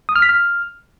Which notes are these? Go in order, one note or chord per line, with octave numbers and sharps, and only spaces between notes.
D#6
F6
B6
F6